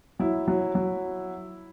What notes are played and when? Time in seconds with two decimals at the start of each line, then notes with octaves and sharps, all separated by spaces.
0.19 F#3 E4
0.48 F#3
0.75 F#3